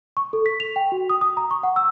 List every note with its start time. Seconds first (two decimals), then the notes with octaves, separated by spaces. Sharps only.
0.17 C#6
0.33 A4
0.46 B6
0.60 F7
0.76 G5
0.92 F#4
1.10 D#6
1.21 D#6
1.37 A#5
1.51 C#6
1.63 F#5
1.76 E6